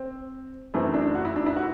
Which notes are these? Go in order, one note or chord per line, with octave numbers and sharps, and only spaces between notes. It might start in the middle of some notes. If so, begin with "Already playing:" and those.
Already playing: C4
F#2 E3 A3 C4
D4
F#4
E4
D4
E4
F#4